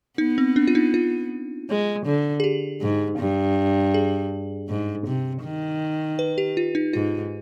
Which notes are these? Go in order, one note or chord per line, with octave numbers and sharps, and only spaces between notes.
B3 D#4
C4
D4
F4
D#4
F4
G#3
D3
G#4
G4
G#2
G2
G#4
G#2
C3
D#3
B4
G4
F4
D#4
G#2 F4